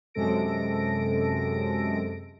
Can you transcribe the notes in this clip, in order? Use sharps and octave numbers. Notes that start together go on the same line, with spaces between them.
F#2 C3 G#3 A4 A#6 D7